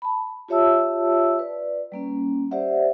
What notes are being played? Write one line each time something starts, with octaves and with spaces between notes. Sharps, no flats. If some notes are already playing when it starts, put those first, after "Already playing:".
A5 B5
F4 G4 C#5 E5 A5 E6
B4 D5
G3 A#3 C#4
G4 C5 D5 E5 F#5